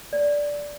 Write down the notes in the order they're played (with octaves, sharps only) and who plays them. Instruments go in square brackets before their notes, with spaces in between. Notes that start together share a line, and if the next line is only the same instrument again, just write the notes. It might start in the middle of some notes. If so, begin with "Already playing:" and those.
[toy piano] D5